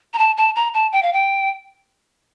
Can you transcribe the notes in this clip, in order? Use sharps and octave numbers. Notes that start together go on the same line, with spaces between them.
A#5
A5
A5
A#5
A5
G5
F5
G5